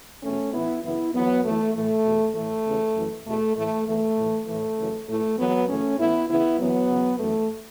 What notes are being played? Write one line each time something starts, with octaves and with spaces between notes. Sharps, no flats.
E2 B2 A3 C#4
A2 E3 B3 E4
F#2 C#3 E3 B3 E4
E2 E3 F#3 B3
F#2 E3 A3
A2 E3 A3
E2 B2
A2 E3 A3
E2 C#3 E3
F#2 E3
E2 B2 A3
A2 E3 A3
E2 E3 A3
A2 E3
A2 E3 A3
F#2 C#3 E3
A2 E3 A3
E2 E3 F#3 B3
F#2 C#3 E3 A3 C#4
A2 E3 B3 E4
E2 C#3 E3 B3 E4
F#2 E3 F#3 B3
E2 C#3 E3
F#2 E3 A3